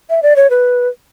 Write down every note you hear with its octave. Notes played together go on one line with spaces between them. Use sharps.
E5
D5
C#5
B4